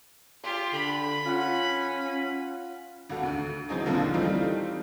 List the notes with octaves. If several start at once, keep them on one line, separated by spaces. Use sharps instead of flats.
F4 G4 C6
D3 B5
C#4 F4 F#5
G#1 F#4 A4
D2
E3 F#3 C4 D#4 G#4
A#1 D#2 D3 F3 A4 F5
E3 G3 A3 C4 D#4 F4